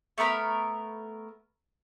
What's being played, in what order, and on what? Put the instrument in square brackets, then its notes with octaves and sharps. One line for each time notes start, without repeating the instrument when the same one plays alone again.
[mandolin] A3 B3 A#4 B5